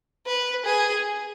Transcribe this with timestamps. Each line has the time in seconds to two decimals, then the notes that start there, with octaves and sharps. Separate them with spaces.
0.27 B4
0.66 G#4